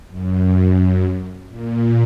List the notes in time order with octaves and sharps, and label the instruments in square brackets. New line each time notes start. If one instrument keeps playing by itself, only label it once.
[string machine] F#2
A#2